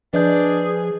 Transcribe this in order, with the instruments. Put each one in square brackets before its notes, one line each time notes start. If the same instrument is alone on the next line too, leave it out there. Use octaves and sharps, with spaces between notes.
[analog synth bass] F3 [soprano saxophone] D4 [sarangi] G#4 [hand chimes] B4 D#5 G6